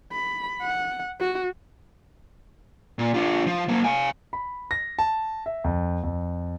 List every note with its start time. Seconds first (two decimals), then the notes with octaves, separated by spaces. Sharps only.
0.12 B5
0.62 F#5
1.20 F#4
2.99 A#2
3.14 D4 F4
3.46 F3
3.69 F#3 A#3
3.84 F5 G#5
4.33 B5
4.71 A#6
4.99 A5
5.46 E5
5.64 F2
6.03 F2